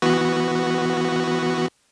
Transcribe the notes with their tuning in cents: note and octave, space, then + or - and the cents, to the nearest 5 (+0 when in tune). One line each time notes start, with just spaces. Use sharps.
E3 +0 B3 +0 F#4 +0